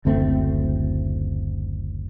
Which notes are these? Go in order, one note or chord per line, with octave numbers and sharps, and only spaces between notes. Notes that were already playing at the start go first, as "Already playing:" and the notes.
F#1 D2 A3 C4